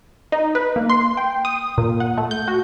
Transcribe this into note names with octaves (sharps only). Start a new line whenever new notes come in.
D#4
B4
A#3
C6
G5
D#6
A#2
F#5
A3
G6
F#4